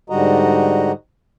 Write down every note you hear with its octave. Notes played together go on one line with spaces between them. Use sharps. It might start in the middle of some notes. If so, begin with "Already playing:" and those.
G#2 D3 G3 F#4 D#5 A#5